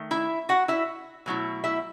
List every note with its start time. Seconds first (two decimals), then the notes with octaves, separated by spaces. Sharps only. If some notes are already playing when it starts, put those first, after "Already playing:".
Already playing: D#3 A3
0.11 E4 E5
0.49 F#4 F#5
0.68 E4 E5
1.26 B2 F#3 A3 E4
1.64 E4 E5